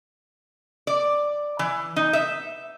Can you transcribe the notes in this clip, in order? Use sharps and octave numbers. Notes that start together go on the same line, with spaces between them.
D5
E3
D#4
E5